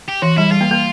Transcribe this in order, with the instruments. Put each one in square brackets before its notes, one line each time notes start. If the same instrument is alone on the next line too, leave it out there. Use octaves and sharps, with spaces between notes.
[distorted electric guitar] G4
[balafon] E3 [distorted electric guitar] F#4
[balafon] G3 [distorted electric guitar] E4
[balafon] G3 [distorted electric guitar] F4
[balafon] A#3
A#3